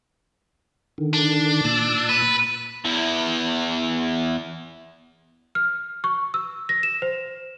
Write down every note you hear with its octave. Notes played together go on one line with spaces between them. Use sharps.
D3 D#3
D4
A#2 A5 E6
B4
E2 E3
F6
C#6
E6
A#6
E7
C5